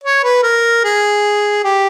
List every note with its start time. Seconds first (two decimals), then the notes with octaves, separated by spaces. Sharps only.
0.04 C#5
0.24 B4
0.43 A#4
0.84 G#4
1.64 G4